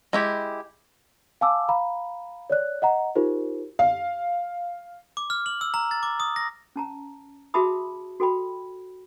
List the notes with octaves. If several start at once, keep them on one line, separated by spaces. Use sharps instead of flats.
G#3 E4 G4
F5 G#5 A5 D6 E6
F5 A#5 B5
C#5 D5 F#6
D#5 F#5 A#5
D#4 F4 G4 A#4 C5
F5
D6
F6
F#7
E6
A#5
A6
D6
D#6
A#6
C#4 A5 A#5
F#4 G#4 E5 A5 B5 D#6
F#4 A4 G5 B5